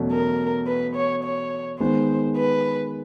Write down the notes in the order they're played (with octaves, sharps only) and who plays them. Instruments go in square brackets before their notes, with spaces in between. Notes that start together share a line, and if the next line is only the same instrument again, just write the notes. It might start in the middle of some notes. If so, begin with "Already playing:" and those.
Already playing: [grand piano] E2 B2 F#3 A3 C#4
[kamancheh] A#4
B4
C#5
C#5
[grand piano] D#3 G#3 B3 [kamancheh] C5
[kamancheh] B4